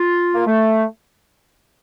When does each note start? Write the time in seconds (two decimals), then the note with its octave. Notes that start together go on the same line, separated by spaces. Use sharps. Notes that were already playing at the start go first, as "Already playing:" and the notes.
Already playing: F4
0.35 A#3
0.47 A3